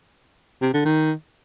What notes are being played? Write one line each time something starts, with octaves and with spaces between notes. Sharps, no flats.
C3
D3
D#3